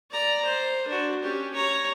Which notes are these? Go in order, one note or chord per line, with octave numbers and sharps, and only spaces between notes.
D5 A#5
C5
D4 F#4
C#4 G4
C#5 A#5